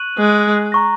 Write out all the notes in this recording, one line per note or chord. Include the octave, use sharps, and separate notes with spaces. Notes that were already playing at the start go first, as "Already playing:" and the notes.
Already playing: C#6 F#6 D#7 F#7
G#3
A#5 C#6 A#6